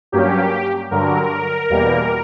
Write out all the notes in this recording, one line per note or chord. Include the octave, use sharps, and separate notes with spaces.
G2 F#3 A#3 C#4 G4
G2 D3 F#3 A#4
E2 B2 G3 A#3